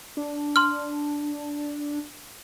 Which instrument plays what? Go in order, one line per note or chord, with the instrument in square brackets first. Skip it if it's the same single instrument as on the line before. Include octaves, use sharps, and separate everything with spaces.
[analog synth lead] D4
[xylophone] C6 F6